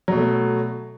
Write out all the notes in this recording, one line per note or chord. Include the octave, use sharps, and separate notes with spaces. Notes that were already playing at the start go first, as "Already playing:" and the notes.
B2 F#3 A3